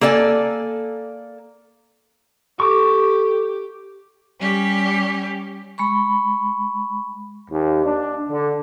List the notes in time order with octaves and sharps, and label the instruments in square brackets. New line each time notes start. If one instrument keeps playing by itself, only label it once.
[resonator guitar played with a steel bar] A#3 A4 D5 D#5 G#5
[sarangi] G4 [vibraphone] A4 [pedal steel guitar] C#6 D6
[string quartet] G3 C#4 G4
[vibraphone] G#3 B5 C#6
[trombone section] D#2
D4
D3